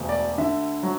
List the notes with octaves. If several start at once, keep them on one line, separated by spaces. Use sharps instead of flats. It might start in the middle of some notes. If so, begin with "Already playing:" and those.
Already playing: E1 D2
D5
D3 E5
F#3